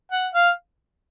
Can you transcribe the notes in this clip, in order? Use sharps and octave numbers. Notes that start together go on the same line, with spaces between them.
F#5
F5